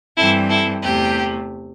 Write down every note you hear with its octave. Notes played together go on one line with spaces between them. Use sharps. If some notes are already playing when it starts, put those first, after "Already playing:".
G2 E3 G3 C4 E4 A4
E4 A4
E2 C3 A3 G4